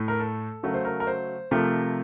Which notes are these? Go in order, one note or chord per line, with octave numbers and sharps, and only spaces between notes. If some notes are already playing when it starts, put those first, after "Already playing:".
Already playing: A2 A3
A#4
A4
C#3 F#3 A3 A#4
C5
A#4
A#4
C5
C3 F3 A3 A#4